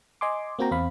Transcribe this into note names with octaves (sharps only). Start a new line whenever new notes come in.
D#5 G#5 C6 D6
A#3 C4 F#4 G5 A#5
E2 C4 F5 B5